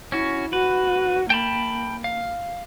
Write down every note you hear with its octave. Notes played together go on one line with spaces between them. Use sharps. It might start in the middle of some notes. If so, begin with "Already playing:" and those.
C#4 E4 F#4
F#4 B4
A#3 G5 A5 B5
F5